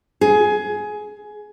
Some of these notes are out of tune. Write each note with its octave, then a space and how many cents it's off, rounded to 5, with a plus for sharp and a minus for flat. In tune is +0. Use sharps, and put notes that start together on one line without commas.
G#4 +15